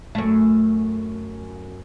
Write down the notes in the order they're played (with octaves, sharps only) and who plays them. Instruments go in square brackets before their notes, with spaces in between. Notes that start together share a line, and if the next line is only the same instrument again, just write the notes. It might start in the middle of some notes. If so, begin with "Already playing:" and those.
[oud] F#2 A3